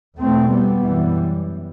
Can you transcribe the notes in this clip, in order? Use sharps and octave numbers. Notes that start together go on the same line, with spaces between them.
E2 B2 A3 C4
G3 B3
F#2 E3 G3